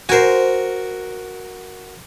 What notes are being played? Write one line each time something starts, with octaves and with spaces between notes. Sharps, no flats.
F#4 A#4 C5 G#5